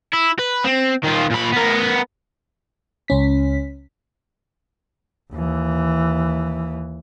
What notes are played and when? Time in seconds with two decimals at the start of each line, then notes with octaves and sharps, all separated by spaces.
0.13 E4
0.39 B4
0.65 C4
1.04 D#3 F4
1.31 A#2 B5
1.54 B3 A#4
3.08 C#2 C#4 B6
5.33 D#2 E3